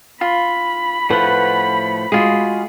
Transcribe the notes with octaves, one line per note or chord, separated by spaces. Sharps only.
F4 B5
A2 F3 A3 B4 F#5
G#3 F4 F#4 G#4